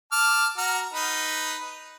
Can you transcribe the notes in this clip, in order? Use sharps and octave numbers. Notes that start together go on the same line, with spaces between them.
A5 D6 F6
F#4 A#5 F6
D#4 B4